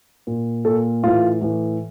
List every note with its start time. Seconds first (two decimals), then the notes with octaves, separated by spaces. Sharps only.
0.27 A#2
0.65 A#2 A4
1.03 A2 E3 F4
1.41 A2 E3